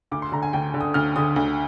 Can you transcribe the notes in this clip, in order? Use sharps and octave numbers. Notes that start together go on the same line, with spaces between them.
D2 D6
C6
D3 A#5
G#5
D2 G5
D3
D#6
D2 F6
D3 D#6
D2